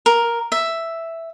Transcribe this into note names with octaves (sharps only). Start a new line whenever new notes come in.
A#4
E5